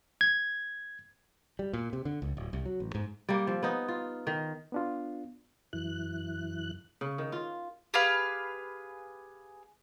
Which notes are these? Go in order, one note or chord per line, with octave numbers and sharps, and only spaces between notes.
G#6
G3
A#2
C3
D3
C#2
D1
C2
F#3
A1
G#2
G3 A#3
F3 C4
B3 D#4
F4
D#3
B3 D4 F4
F#2 E3 F#6
C#3
D#3
F4
G4 G#4 B4 F5